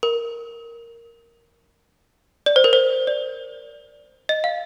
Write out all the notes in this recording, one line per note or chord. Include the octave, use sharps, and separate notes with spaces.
A#4
D5
C5
A#4
C5
D5
D#5
F5